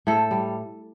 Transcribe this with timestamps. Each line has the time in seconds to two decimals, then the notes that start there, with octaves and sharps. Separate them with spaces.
0.07 A2 A4
0.31 G3